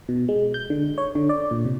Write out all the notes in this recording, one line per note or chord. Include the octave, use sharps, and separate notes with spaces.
B2
G#3
G6
D3
C#5
D3
D5
A#2
C3